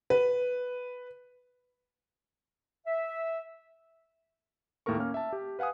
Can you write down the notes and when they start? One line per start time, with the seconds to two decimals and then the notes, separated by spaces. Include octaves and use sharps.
0.10 B4
2.87 E5
4.86 D#2 A2 A#3 A4 A#4 C#6
4.98 A#3 C#4 F6
5.14 E5 A5
5.33 G4
5.59 B4 F5 F#5 G#5 D#6